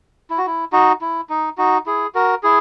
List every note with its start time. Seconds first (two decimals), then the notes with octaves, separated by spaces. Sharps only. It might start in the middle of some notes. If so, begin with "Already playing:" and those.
0.30 E4
0.38 F#4
0.47 E4
0.72 D#4 F#4
1.01 E4
1.29 D#4
1.58 D#4 F#4
1.86 E4 G#4
2.15 F#4 A#4
2.43 E4 G#4